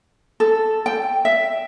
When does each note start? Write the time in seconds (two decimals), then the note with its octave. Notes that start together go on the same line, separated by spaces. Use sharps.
0.40 A4
0.86 G5
1.25 E5